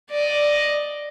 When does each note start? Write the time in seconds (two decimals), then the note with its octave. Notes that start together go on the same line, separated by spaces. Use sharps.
0.10 D5 D#5